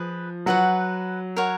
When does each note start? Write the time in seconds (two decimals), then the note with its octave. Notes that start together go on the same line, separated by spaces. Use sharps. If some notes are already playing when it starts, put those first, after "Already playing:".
Already playing: F3 G#4 B4
0.46 F#3 F#4 B4 F#5
1.37 A#4 C#5 F#5